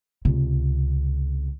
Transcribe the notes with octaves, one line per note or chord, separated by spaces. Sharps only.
C#2 C3